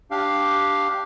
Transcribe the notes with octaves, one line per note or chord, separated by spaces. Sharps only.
D4 G4 F5